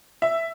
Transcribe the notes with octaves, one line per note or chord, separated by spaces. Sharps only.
E5